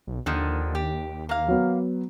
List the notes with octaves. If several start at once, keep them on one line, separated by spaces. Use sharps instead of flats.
B1
D#2 D3 D#3 F3
G4
A#3 F5
F#3 B3